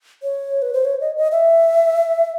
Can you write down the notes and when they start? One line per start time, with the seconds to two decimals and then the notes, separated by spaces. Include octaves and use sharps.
0.23 C#5
0.62 B4
0.73 C5
0.85 C#5
1.01 D#5
1.17 D#5
1.32 E5